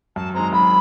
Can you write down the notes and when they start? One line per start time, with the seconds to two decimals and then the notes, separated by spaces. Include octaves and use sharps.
0.16 F#2 A5
0.34 D#3 G#3 C4 A#5
0.53 F#2 B5